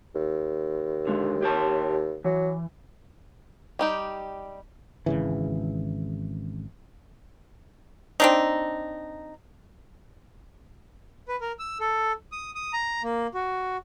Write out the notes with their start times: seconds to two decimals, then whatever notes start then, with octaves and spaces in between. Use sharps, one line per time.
0.15 D#2
1.07 D3 G#3
1.42 G4 C#5 A5
2.24 E3 F#3
3.79 G3 D#4 G4
5.06 G#1 C#3 E3
8.20 C4 D4 D#4
11.28 B4
11.41 A#4
11.59 E6
11.80 A4
12.32 D#6
12.55 D#6
12.73 A#5
13.03 A#3
13.34 F#4